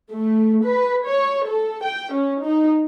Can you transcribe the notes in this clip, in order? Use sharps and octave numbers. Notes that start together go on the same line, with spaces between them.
A3
B4
C#5
A4
G5
C#4
D#4